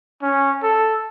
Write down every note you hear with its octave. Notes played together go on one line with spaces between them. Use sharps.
C#4
A4